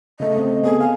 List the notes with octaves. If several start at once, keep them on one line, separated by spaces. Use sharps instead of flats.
C#3 A3 D#5
C4
B3 G#4 A4
F5 G#5